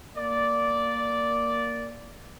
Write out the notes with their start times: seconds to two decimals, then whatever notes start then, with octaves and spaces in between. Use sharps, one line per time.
0.17 A#3 D5